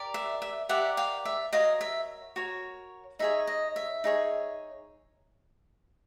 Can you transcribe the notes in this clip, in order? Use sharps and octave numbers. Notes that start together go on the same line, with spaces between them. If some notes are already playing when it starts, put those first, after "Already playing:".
Already playing: G4 A#4 D5
E5
E5
G4 A#4 D5 E5 F#5
F5 G5
E5
F#4 A#4 C#5 D#5 F5
E5
F#4 A#4 C#5
D#4 G#4 C#5 E5
D#5
E5
D#4 G#4 C#5